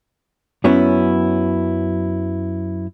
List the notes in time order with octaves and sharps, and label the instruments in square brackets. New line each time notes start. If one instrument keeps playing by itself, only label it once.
[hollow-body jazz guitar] F#2 F#3 B3 C#4 E4